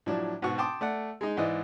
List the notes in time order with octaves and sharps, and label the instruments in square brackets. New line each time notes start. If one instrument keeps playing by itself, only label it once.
[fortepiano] A2 F3 F#3 D4
G#2 B2 F#4 C#6
G5 A5 C6 D6 D#6
A3 D5 F#5
G#3 D#4
G#2 E3 D5 D#5